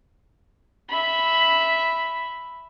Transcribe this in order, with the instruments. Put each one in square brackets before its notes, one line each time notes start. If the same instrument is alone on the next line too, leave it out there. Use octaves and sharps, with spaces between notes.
[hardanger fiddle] E5 B5